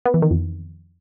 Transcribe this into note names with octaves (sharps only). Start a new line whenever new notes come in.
B3
E3
D#3
F2